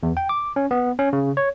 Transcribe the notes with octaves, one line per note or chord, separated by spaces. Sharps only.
E2
G5
D6
C#4
B3
C#4
C#3
C#5